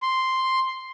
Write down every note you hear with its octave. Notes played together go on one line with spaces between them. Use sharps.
C6